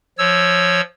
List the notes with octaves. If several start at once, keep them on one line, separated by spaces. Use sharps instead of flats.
F3 C#5 E6